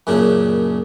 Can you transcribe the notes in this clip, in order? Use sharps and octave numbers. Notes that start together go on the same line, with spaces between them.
F#2 A#2 C#3 D4